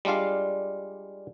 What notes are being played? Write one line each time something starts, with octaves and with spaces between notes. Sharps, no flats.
G3 G#3 D4 F4 F5